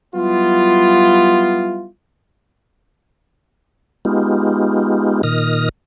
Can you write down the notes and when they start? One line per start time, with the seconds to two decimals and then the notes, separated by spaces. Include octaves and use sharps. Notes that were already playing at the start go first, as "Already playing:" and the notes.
0.15 F#3 G3 B3 E4 F4
4.05 G#3 B3 D#4 F4 G4
5.23 A#2 D#3 D#6 F6 A#6